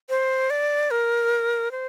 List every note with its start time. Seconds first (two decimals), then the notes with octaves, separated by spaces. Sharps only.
0.10 C5
0.50 D5
0.91 A#4
1.71 C5